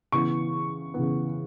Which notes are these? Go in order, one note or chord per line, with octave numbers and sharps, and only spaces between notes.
C#3 E3 B3 C#6
C#3 E3 B3